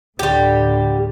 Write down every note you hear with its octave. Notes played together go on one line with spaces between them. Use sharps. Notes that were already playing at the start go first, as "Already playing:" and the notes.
D2 A2 D3 G3 G4